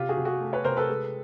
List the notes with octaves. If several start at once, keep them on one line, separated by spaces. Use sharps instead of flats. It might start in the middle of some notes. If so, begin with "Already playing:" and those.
Already playing: C3 F4 G4
F#4 G#4
C3
F#4 G#4
A3
B4 C#5
C3 A#4 C5
A4 B4
G#3